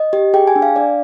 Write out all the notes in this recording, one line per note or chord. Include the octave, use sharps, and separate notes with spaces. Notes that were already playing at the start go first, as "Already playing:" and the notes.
Already playing: D#5
G4
G#4 G5
G#5
D4
F5
D4 D5